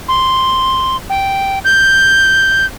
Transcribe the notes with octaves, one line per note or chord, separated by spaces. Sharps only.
C6
G5
G6